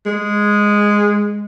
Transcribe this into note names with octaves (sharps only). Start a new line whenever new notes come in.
G#3